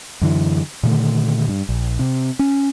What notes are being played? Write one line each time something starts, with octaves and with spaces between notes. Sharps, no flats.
F#2 D3 E3
A#2 D3 D#3 A3
G2
A#1
C3
C#4